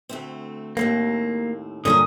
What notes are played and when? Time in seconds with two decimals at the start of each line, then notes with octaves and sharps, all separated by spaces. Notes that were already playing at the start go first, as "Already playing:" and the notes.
0.09 D2 A3 C4
0.77 D#2 A2 A#3 C4
1.85 G2 A#2 D3 C#4 G#4 A#4 D#6